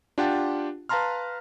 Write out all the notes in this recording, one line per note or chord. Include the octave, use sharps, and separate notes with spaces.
D4 F4 G4 F#5 G5 A5
B4 F5 A5 A#5 C6 F6